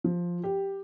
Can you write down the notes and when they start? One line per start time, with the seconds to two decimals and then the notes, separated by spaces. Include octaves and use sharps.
0.04 F3
0.44 G4